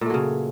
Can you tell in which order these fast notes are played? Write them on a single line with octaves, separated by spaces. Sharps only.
A#2 A3 F#3 C#3